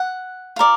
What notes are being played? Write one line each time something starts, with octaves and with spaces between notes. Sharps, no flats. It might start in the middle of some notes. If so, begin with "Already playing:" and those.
Already playing: F#5
F4 A#4 D5